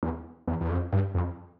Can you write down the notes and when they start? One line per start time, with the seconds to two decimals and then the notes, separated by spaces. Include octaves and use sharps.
0.03 E2
0.48 E2
0.61 E2
0.71 F2
0.93 G2
1.15 F2